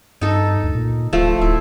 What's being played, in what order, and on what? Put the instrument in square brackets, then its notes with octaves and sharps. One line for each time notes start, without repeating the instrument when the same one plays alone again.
[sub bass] G2 [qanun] D#4 A4
[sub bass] D2
A#2
[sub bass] D1 [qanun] F3 A3
[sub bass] D1 [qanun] E4